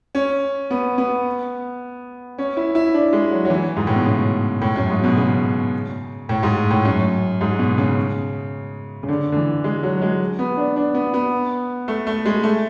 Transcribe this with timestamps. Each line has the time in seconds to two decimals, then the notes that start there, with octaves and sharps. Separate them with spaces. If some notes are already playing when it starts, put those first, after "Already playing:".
0.15 C#4
0.70 B3
0.98 B3
2.38 C#4
2.57 E4
2.75 E4
2.94 D4
3.13 G#3
3.31 F#3
3.45 F#3
3.50 E3
3.77 G#2
3.87 A2
3.96 B2
4.06 C#3
4.61 A2
4.76 F#2
4.90 G#2
5.04 B2
5.17 C#3
6.29 A2
6.43 G#2
6.70 A2
6.85 F#2
7.41 G#2
7.59 B2
7.78 C#3
9.03 C#3
9.08 D3
9.32 D3
9.37 E3
9.64 G#3
9.83 F#3
10.02 G#3
10.39 B3
10.57 D4
10.76 D4
10.94 B3
11.14 B3
11.88 A3
12.07 A3
12.25 G#3
12.43 A3